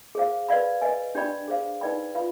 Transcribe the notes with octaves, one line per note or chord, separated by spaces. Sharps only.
G#4 C5 F5
B4 D5 F5 B5
B4 D#5 G#5
D4 G4 D5 G5 B5
G#4 C5 F5
D#4 B4 D5 G5 B5
F4 B4 F5 B5